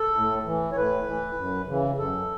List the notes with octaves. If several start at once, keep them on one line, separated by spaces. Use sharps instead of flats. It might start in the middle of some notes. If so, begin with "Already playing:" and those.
Already playing: A4
A2
E3
C#5
A2 B4
E3
F#2
C#3 E3
F#2 A4